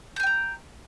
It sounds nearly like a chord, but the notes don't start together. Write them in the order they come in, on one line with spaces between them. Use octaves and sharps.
G6 G#5 G5 A#5